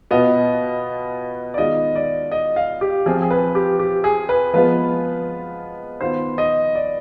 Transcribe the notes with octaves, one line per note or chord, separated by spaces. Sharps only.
B2 B3 F4 D#5
D5
D#3 G#3 B3 F4 D#5
D5
D#5
F5
G4
F3 C4 F4 G#4
G#4
B4
G4
G4
G#4
B4
F3 G#3 B3 F4 B4
D#3 B3 F4 C5
D#5
D5